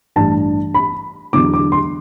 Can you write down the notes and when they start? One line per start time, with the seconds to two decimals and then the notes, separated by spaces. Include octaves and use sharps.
0.16 A1 G2 E3 A5
0.74 B5
1.33 E2 D3 F#3 D6
1.54 D6
1.72 C6